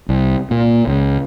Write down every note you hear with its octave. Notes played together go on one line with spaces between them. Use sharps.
C2
A#2
C#2